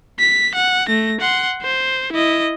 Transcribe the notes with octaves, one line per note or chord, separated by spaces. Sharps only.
B6
F#5
A3 A#6
F#5 C6
C5
E4 D#5